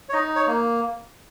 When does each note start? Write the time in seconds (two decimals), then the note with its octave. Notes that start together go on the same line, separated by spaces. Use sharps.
0.09 C#5
0.13 D#4 D#5
0.36 C#5
0.47 A#3